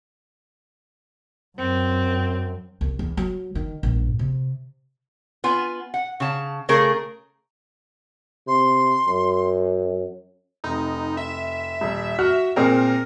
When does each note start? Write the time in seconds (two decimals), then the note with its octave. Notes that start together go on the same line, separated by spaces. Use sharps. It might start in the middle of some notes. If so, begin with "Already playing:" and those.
1.58 F#2 C4
2.81 C2
2.99 E2
3.17 F#3
3.55 D#3
3.83 A#1 G2
4.19 C3
5.44 B3 F4 G#5
5.94 F#5
6.20 C#3 A5
6.69 C#3 A3 G#4 A#4
8.47 C3 C6
9.07 F#2
10.64 F1 D#4
11.17 E5
11.81 D#1
12.19 F#4 F6
12.56 A#2 C4 G#4 A#4